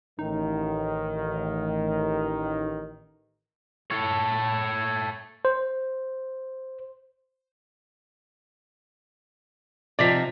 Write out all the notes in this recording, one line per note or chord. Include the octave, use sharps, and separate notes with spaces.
A1 D#3 D#4
A4 C#5
C5
C3 F3 D#4 D5 B6